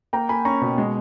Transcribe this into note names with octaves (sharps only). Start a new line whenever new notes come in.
A#3 G5 A#5
A#3 G#5 B5
C#4 A#5 C#6
B2
G#3